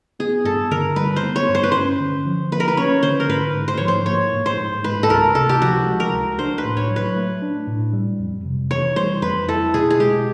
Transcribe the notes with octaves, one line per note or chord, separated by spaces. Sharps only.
B3 G#4
G2 A4
D3 A#4
G3 B4
C5
B3
C#5
G2
C5
B4
C#4 C5
D3
F3
A#3 B4
A#4
B4
C#4 C#5
D3 C5
A#4
G#2 B4
G#2
C5
F3 C#5
C5
A#3 C#5
G#2
C5
G#2
G#3 B4
A4
C#2 A#4
C3 A4
G4
F3 F#4
G#3
A#4
C#2
D4 C5
B4
A2
C#5
F#3
B4
A3
D4
A2
G3
F2
C3
E3 C#5
G3 C5
F2 B4
E4 A4
B2 G#4
G#4
G#3 G4